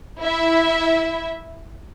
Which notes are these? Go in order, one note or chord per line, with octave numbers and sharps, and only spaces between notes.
E4 E5